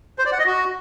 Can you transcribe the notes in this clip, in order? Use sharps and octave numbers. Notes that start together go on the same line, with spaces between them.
C5
D5
F#5
D#5
F#4